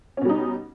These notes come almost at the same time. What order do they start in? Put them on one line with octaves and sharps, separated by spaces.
C#4 B2 G3 D#4